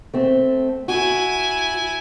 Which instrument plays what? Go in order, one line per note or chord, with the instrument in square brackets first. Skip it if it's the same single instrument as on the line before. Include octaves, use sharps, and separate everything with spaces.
[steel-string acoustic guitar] A3 C4
[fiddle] E4 G#5 [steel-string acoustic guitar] F#4